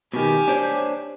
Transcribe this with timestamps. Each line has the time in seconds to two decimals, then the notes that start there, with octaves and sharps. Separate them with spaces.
0.13 B2 D#3 G4 G#5
0.48 D4 C5 C#5